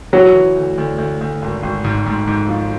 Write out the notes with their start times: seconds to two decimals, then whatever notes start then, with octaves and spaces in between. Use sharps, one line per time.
0.13 E3 F#3
0.35 E3
0.56 D2
0.78 D2
0.98 D2
1.21 D2
1.42 G#1
1.63 G#1
1.84 G#2
2.06 G#2
2.27 G#2
2.49 F3